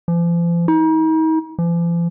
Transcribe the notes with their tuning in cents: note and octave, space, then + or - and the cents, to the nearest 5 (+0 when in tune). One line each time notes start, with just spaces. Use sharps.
F3 -40
D#4 +40
F3 -45